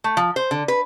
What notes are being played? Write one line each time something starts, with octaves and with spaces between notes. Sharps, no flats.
A3
F3
C5
D3
B4